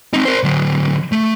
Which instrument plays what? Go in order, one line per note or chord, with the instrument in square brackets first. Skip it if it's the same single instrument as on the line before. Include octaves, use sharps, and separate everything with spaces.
[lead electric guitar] C4 D#4
A#4 C5
D3 F#3
A3